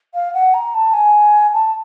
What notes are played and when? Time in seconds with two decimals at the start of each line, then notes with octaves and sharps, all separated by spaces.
0.14 F5
0.34 F#5
0.54 A#5
0.74 A5
0.93 G#5
1.53 A5